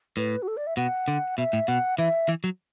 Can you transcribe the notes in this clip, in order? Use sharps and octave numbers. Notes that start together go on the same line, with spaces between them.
A2 B4
F#4
A4
D5
E5
B2 F#5
D3
B2 E5
A2
B2 F#5
E3 E5
E3
F#3